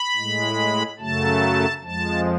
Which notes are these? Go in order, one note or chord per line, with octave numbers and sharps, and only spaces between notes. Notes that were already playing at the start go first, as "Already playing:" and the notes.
Already playing: B5
A2 G#3
F#2 C#3 F#3 A3 A5
F2 F3 G#3 A5